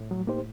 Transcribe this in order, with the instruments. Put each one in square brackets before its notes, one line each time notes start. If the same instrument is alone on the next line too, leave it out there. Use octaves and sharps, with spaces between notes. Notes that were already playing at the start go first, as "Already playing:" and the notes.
Already playing: [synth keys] A2
[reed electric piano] F#3
A#3 D#4 G4 C5